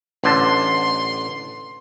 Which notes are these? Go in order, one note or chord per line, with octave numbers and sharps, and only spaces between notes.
A1 D3 A5 C6